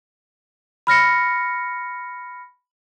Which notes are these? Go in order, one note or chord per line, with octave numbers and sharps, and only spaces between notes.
B5 F6 A#6 C#7